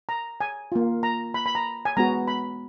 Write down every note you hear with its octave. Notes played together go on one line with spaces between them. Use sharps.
A#5
G#5
A#3 F4
A#5
B5
B5
A#5
G#5
G#3 B3 F#4 A#5
B5